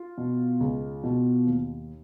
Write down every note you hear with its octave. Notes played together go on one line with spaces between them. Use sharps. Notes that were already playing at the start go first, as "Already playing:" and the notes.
Already playing: F4
B2
C#2
B2
D#2